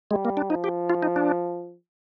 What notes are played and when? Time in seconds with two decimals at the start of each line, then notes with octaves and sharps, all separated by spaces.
0.11 G3 G#3
0.25 A#3
0.37 D4
0.50 F3 D#4
0.64 G4
0.90 F4
1.03 D#4
1.16 D4